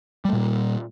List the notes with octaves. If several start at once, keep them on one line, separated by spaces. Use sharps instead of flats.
A#2 G3 A3 A#3